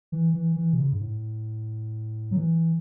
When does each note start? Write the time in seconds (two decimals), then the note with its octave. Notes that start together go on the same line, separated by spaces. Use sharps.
0.12 E3
0.34 E3
0.56 E3
0.73 B2
0.79 C#3
0.93 G2
1.01 A2
2.31 F#3
2.36 E3